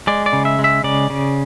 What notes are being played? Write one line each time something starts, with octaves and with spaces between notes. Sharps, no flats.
G#3 D5
D5
C#3
E5
G#3
E5
C#3 D5
C#3